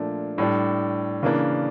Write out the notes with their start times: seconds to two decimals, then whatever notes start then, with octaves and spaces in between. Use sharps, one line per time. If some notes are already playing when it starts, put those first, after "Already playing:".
Already playing: A#2 F3 A3 D4
0.38 A2 G3 D4
1.23 C#3 E3 A#3 D4